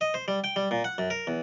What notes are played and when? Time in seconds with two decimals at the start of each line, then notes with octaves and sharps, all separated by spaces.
0.01 D#5
0.14 C5
0.28 G3
0.44 G5
0.56 G3
0.71 A#2
0.84 F#5
0.98 F#2
1.10 A#4
1.27 E2